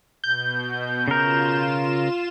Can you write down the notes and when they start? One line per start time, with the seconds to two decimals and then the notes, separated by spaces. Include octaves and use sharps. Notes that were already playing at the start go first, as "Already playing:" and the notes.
0.24 B2 G6
1.08 C#3 F4 A#4 E7